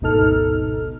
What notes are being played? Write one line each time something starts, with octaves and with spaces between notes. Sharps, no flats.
G#1 D2 B2 D#4 A4 F6